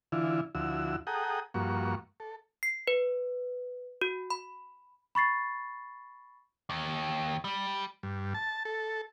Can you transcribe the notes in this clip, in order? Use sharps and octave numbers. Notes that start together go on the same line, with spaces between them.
D3 E3 E4 F4
D2 F3 E4 F#4 E6
G#4 A4 F#5 G5 A#5 D#6
G2 F3 A#3 F#4 C#6
A4
C7
B4
F#4
B5
B5 C#6 A6 C7
D#2
G3
G2
A5
A4